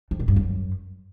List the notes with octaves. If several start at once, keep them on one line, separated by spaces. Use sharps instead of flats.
F2
A2
G2
F#2